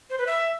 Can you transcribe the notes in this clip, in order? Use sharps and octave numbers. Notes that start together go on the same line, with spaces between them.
C5
B4
E5